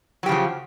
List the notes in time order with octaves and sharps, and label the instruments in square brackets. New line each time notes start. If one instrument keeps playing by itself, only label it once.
[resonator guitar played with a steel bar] F#3
G4
C#3
F3